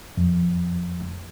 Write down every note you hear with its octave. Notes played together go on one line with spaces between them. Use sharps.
F2